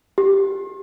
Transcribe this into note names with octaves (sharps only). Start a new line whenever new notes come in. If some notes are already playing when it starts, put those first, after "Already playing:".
G4